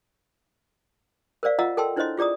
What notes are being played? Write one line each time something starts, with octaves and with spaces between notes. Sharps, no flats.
A#4 C5 D5 F5
F4 D#5 F5 F#5 A#5 E6
A4 A#4 G5 A5 C6 E6
D4 E4 C5 C#5 D#5 C6
F4 G#4 D5 A#5 D#6